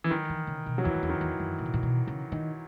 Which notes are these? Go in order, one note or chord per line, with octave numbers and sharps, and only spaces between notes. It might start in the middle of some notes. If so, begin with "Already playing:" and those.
E3
D#3 F#3
E3
C#3
B2
F#3
E2 E3
F#2
E2
D#3
E2
F#2
A#2
B2
A#2
B2
C#3
D#3